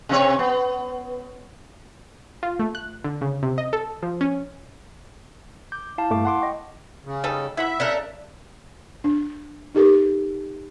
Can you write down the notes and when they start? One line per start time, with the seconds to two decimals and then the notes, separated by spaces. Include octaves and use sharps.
0.09 C3 C4 C#5
0.39 B3
2.43 F4
2.59 A3
2.75 F#6
3.04 D3
3.21 C#3
3.43 C3
3.58 D#5
3.73 A4
4.03 F3
4.21 C#4
5.72 D6 G6
5.98 E4 F5 A5
6.10 G2 A3 D6
6.25 F#5 C6 D6
6.41 D#5 G5 C#6
7.05 C#3
7.24 G3 D#4 A4
7.57 E4 E5 F#5 B5
7.80 C#3 D4 A4 A#4
9.04 D4
9.74 D#4 G4 A4 A#4